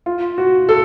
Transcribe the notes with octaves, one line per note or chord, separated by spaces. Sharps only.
F4
F#4
A4